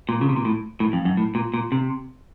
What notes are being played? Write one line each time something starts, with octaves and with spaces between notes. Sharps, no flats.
A#2
C#3
C3
A#2
A2
A2
F2
F#2
A2
A#2
A#2
C3